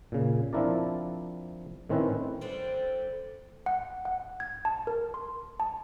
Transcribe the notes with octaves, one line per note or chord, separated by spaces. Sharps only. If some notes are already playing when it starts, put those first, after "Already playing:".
A#2 C#3
F3 C4 D4 E4 A#4 D5
A2 D#3 C4 C#4 E4 B4
D3 G3 C4
F#5
F#5
G#6
A5
A#4
C6
A5